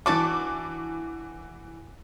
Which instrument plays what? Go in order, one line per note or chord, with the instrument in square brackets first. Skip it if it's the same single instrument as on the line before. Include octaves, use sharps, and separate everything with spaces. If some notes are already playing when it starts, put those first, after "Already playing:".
[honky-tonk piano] E3 D6 [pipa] D4 F#4 A5